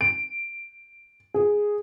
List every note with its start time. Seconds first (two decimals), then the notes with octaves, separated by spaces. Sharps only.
0.01 D7
1.34 G#4